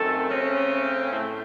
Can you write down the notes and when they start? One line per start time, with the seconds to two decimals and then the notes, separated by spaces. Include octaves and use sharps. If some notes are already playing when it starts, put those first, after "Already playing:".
Already playing: F#2 D#3 A3 C4 A4
0.29 C#3 A3 C4 C#4
1.12 A2 A3 C4